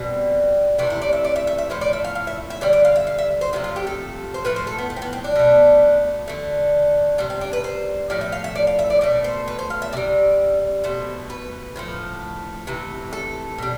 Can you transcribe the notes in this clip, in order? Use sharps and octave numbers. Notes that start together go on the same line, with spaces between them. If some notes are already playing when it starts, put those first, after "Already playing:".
Already playing: B2 G3 C4
C3 E3 A3 D4
E4
D5
E5
D5
E5
E5
E5
A2 F3 A3 C5
D5
E5
F5
F5
E5
E5
D3 G3 D5
D5
F5
E5
F5
E5
C5
C3 F3 A3 F4
F4
G4
A4
C5
A2 F3 A3 B4
C5
A4
B3
A3
C4
B3
C4
D4
B2 A3
D3 A3
C3 G3 D4
C4
D4
B4
C5
A2 F3 A3 D5
E5
F5
E5
D5
F5
E5
D5
B2 A3 D5
C5
B4
C5
F5
E5
C3 G3 D5
B2 A3 C5
B4
A2 F3 A3
C3 E3 A3
A4
B2 G3